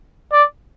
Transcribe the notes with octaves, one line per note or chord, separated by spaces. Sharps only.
D5